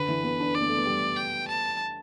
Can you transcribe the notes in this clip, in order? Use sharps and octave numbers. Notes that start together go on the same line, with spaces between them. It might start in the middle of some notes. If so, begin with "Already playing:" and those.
Already playing: D3 B4
E3
B3
D4
D4 D5
B3
A3
B3
G3
G5
A5